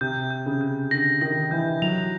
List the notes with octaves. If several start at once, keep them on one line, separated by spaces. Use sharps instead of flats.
C3 G6
G6
C#3
G6
D3 A#6
D#3 A#6
E3 G6
F#3 F7